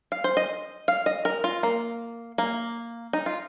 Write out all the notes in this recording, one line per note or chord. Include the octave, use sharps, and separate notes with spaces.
F5
C5
D#5
F5
D#5
A#4
F4
A#3
A#3
D#4
F4